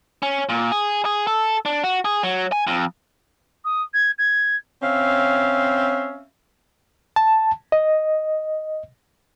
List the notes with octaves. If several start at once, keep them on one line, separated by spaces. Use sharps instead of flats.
C#4
A#2
G#4
G#4
A4
D4
F#4
G#4
F#3
G#5
F2
D#6
G#6
G#6
C4 C#4 E5 F5
A5
D#5